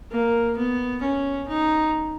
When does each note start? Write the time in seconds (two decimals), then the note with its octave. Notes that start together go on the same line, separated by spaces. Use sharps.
0.11 A#3
0.57 B3
1.02 C#4
1.48 D#4